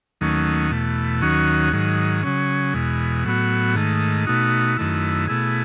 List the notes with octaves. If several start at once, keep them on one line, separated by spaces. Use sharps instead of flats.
D#2 D#3 F#3 A3 C#4
E2 B2 A3
D#2 D#3 F#3 C#4 F#4
G#2 D#3 F#3
C#3 F#3 C#4
E2 B2 G#3
A2 F#3 B3 F#4
G#2 D#3 A3
B2 A3 D#4 F#4
F#2 D#3 A3 E4
B2 A3 E4 G#4